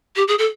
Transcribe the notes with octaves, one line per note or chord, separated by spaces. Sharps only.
G4
G#4
A4